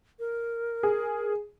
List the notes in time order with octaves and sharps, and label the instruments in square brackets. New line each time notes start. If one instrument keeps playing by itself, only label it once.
[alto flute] A#4
[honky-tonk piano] G#4